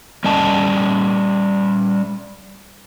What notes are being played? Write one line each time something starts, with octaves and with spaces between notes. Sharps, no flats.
G3 C#4 D#5 A5